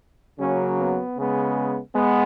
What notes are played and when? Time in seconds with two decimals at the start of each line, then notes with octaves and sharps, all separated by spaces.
0.37 C#3 F#3 A#3 C#4
0.78 B3
1.16 C#3 G#3 B3
1.94 G#3 B3